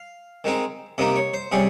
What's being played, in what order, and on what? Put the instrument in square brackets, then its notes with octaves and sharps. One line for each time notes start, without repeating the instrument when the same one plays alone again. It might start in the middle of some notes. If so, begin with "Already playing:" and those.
Already playing: [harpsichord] F5
D#3 G#3 C4 D#4
C3 D#3 A#3 D#4 D#5
C#5
C5
C3 G3 C#4 G#4